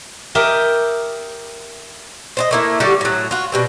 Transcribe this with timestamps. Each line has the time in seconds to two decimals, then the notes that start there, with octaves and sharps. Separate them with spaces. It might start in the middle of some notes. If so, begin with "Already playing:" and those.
0.35 G4 A#4 D#5 E5
2.37 C5 D5 D#5
2.51 A3 A#3 E4
2.80 D3 G3 F#4 G4
3.01 A2 F#3
3.31 F4 F#4
3.52 B2 G3 C4